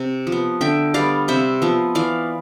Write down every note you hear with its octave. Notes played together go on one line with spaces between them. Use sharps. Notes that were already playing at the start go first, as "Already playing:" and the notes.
Already playing: C3
F3
B3
D3 E5 G5
G3 B3 D5 F5
C3 C5 E5
F3 B3
E3 D5 F5